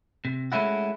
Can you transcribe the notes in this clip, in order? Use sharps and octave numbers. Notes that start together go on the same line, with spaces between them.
C3
G#3 A3 C#4 E4 F#4